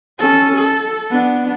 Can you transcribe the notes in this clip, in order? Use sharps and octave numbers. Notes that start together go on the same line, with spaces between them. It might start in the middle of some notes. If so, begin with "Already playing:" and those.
C#4 A4
A4
B3 D4